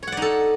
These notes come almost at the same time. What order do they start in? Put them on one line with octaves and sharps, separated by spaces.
C#5 F#5 D5 D#4 A4